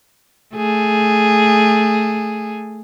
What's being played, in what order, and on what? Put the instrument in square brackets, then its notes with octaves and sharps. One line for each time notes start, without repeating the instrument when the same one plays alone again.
[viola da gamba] A3 G#4